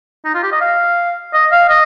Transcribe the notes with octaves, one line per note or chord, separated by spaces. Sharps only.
D#4
F4
G4
D#5
F5
D#5
F5
D#5